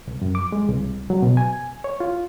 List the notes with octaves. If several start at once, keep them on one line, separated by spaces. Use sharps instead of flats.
C2
F#2
D6
G#3
C2
F#3
B2
G#5
C#5
F4